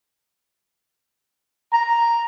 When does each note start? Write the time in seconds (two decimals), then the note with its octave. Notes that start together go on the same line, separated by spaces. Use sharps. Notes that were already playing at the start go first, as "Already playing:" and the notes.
1.73 A#5